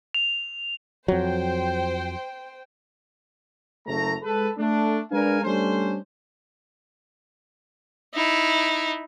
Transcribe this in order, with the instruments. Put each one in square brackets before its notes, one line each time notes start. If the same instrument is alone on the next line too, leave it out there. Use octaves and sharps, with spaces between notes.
[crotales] F7
[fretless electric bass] F2 F#3 [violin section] C5 G5
[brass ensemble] F#1 A3 A#5
G#3 A4 B4
A3 D4
G#3 D4 A#4 B4 F5 G#5
G3 A3 C#4 D4 C5
[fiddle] D#4 E4